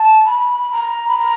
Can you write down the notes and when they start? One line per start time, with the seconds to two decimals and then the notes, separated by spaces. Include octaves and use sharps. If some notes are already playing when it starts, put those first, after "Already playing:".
Already playing: A5
0.25 B5
0.72 A#5
1.08 B5
1.18 A#5